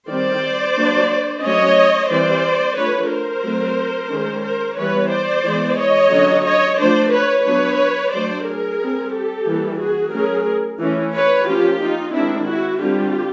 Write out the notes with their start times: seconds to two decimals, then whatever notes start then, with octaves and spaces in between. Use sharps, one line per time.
0.09 D#3 G3 C4 C5 D5
0.76 F#3 A#3 D4
1.43 F#3 A3 C#4 C#5 D#5
2.09 E3 G3 C4 C5 D5
2.77 F3 A3 D4 B4 C#5
3.10 A#4 C5
3.44 F#3 A3 C4
4.10 D#3 G#3 C#4
4.44 A#4 C5
4.77 E3 G3 B3 B4 C#5
5.11 C5 D5
5.45 E3 G#3 B3
5.78 C#5 D#5
6.12 D3 F#3 A#3 C#4
6.45 C#5 D#5
6.78 F3 A3 D4 C5 D5
7.11 B4 C#5
7.45 F#3 B3 D4 B4 C#5
8.12 F#3 A3 D4 C5 D5
8.45 G#4 A#4
8.79 G3 C4
9.13 G4 A4
9.46 E3 G3 A#3
9.79 F#4 G#4
10.13 F#3 A3 C#4 G#4 A#4
10.80 E3 A3 C#4
11.13 B4 C#5
11.46 F3 A#3 C#4 F4 G4
11.80 D#4 F4
12.13 D#3 G#3 C4 D4 E4
12.47 E4 F#4
12.80 D3 G3 C4 F4 G4